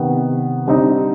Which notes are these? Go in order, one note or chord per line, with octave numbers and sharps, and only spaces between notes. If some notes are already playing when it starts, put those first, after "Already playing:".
Already playing: C3 D#3 B3
D3 G3 C4 D#4